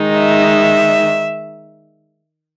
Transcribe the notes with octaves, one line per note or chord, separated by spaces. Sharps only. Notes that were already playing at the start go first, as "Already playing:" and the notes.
Already playing: D#3 G#3 D#4
E5